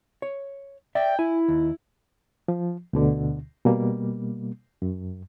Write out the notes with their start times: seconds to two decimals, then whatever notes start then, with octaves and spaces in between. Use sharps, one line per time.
0.22 C#5
0.95 D5 E5 G5
1.19 E4 G#5
1.48 D#2
2.48 F3
2.93 D2 B2 D3
3.66 B2 G3 A#3
4.82 F#2